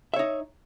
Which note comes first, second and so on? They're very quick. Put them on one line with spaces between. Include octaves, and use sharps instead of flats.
E5 C#5 D#4